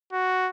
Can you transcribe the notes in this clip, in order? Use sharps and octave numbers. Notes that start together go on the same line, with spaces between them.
F#4